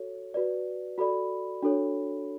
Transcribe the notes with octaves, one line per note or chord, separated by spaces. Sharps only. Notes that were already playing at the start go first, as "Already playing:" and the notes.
Already playing: F#4 A4 C#5
F#4 B4 D5
F#4 A4 D5 B5
D4 F#4 A4 C#5